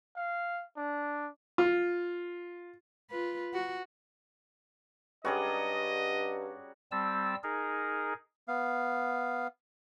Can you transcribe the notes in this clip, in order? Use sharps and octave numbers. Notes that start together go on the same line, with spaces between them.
F5
D4
F4
F4 B4
F#4
G2 G3 C#4 F#4 G#4 D5 D#5 A#5
G3 C4 A5 E6
D#4 G#4 A#4
B3 F5